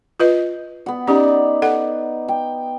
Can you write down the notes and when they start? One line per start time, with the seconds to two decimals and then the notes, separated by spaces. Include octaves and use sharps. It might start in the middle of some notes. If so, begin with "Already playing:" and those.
0.20 F4 B4 D#5
0.86 B3 F#5
1.07 C#4 D#4 G4 D5
1.62 A4 F#5
2.28 G5